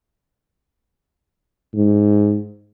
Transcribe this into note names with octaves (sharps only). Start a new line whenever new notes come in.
G#2